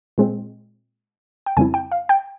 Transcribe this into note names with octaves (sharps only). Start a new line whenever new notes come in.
A#2 G#3 C4
G5
F2 C#3 G3 C4 E4 G#5
G5
F5
G5